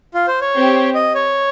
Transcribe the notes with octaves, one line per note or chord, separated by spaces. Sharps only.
F4
C5
C#5
C4 G4 C5
D#5
C#5